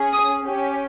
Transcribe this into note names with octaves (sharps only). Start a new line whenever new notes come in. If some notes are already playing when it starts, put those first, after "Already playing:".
Already playing: C#4 G#4
D#6
C#4 G4